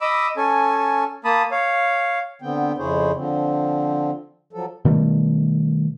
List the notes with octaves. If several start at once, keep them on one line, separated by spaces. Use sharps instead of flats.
D#5 B5 D6 E6
C#4 A4 G#5
A#3 A5 B5 D#6
C#5 F5
D3 B3 C4 G5
F2 C#3 E4 G#4 C5 C#5
D3 F3 C4
F3 F#3 A4
B2 D#3 G3 A3